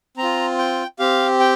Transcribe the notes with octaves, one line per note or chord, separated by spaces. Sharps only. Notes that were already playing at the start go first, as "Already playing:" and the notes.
C4 A#5
F4
G5
C4 G4 F5
G5